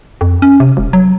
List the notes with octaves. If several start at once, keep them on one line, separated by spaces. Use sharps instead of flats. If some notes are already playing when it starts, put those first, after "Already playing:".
F2
C#4
C3
E1
F#3